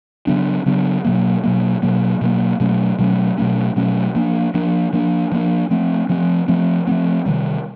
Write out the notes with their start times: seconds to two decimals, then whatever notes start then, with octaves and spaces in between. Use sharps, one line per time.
0.27 C#3 F#3 B3 D4
0.66 C#3 F#3 B3 D4
1.04 B2 F#3 A#3
1.44 B2 F#3 A#3
1.82 B2 F#3 A#3
2.21 B2 F#3 A#3
2.60 B2 F#3 A3 C#4
2.99 B2 F#3 A3 C#4
3.38 B2 F#3 A3 C#4
3.76 B2 F#3 A3 C#4
4.15 F3 A#3 D4
4.54 F3 A#3 D4
4.93 F3 A#3 D4
5.32 F3 A#3 D4
5.71 F3 A3 C4
6.09 F3 A3 C4
6.48 F3 A3 C4
6.87 F3 A3 C4
7.26 C3 D#3 G3